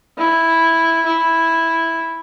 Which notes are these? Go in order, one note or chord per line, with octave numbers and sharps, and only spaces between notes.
E4
E4